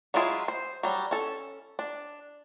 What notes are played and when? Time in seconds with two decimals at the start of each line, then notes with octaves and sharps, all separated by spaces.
0.14 F#3 G#3 E4 F4 G#4
0.48 C5
0.83 F#3 G3
1.11 C#4 A4
1.79 D4